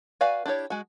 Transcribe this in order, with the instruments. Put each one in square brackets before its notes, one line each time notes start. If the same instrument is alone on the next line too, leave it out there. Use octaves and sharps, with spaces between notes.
[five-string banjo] F#4 B4 D5 F5 G#5
D4 E4 G4 C#5
G#3 F#4